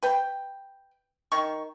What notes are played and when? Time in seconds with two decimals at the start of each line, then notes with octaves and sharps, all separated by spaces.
0.03 B4 G5
1.32 D#3 C#6